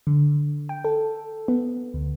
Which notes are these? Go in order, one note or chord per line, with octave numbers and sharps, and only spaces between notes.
D3
G5
A4
B3
D2